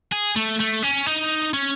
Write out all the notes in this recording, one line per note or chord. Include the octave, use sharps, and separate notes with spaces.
G#4
A3
A3
C#4
D#4
C#4